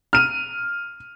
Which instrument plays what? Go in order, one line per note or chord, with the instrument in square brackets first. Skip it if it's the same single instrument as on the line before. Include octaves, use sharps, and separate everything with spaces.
[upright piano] F6 D#7